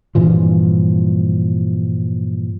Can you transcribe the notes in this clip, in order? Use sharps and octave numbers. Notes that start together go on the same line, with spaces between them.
G2 A#2 E3 F3